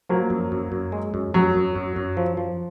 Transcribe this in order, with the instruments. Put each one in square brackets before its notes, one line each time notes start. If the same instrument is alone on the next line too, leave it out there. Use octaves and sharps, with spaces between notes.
[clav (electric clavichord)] F3 [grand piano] F#3 A#3
[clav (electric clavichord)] F#2
F#2
F#2
G#3
F#2
[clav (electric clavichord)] F#2 [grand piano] F#3
[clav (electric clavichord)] F#2
F#2
F#2
F3
F3